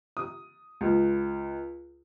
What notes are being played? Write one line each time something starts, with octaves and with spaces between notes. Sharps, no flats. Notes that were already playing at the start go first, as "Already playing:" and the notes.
D#6
C#2